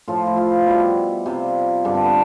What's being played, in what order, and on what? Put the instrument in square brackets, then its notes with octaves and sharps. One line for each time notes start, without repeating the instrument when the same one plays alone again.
[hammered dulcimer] A2 F3 F4
E4
F4
B2 G3 E4
C3 G3 F4
G2 D3 G3 D4
C4
B3